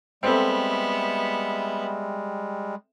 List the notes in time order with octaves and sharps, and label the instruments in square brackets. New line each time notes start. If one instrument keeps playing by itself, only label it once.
[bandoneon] G3 G#3 [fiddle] B3 E5 [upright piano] C4 A4